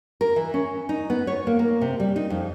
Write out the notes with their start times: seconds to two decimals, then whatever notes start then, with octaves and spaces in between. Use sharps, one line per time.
0.21 A#4
0.36 E3
0.54 C#4
0.89 D#4
1.10 B3
1.27 C#5
1.47 A#3
1.59 A#3
1.81 C3
2.00 G3
2.16 D#4
2.30 F2